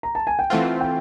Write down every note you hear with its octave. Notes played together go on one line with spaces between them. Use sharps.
A#5
A5
G#5
G5
E3 A3 C4 F4 F#5
G5